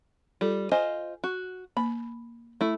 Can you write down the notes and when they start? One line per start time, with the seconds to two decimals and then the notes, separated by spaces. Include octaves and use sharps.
0.41 G3 F4 A4
0.72 F4 C5 D#5 G#5
1.24 F#4
1.77 A#3 B5
2.61 A3 E4